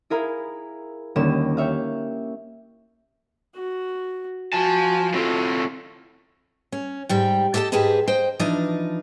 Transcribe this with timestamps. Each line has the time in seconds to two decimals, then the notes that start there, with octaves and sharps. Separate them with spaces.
0.10 E4 G#4 A#4 F5 B5
1.16 D#2 D3 G3 A#3 C#4 E7
1.57 G4 C#5 E5 F5
3.55 F#4
4.53 F3 F#4 G#5 A5
5.13 A2 C4 F4 A4
6.72 C#4
7.09 G#2 G3 G5
7.54 G4 A4 D#5 F5 A5
7.72 G#2 G4 G#4 B4 D#5 A5
8.08 C5 D#5 G5
8.39 E3 F3 D4 D#4 D#5